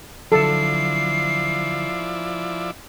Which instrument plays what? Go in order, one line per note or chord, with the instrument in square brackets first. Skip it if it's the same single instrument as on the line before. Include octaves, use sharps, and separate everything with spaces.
[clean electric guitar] D3 F#3 [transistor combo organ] F3 E4 D5 [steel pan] A4 [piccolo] C7